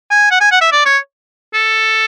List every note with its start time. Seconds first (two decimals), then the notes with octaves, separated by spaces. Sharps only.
0.11 G#5
0.31 F#5
0.41 G#5
0.51 F#5
0.61 E5
0.72 D5
0.86 C#5
1.54 A4